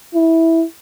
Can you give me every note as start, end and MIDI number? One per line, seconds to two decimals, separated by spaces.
0.14 0.64 64